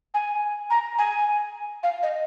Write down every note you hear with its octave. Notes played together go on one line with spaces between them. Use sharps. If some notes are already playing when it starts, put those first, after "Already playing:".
G#5
A#5
G#5
F5
D#5